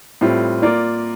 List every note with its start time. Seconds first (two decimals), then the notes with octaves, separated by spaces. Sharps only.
0.21 A2 G3 C4 F4
0.62 A#3 F4 A#4 D5